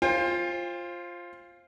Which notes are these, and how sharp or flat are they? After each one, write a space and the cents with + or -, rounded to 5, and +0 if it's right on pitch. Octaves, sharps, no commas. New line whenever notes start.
F4 +0 C5 +25 G5 +45